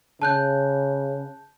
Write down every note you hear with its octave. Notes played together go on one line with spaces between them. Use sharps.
C#3 A5 F#6 G6